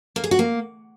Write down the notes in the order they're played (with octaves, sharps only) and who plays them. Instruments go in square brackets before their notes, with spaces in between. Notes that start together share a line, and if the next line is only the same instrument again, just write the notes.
[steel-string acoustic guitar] A#3
G#4
F#4
A#3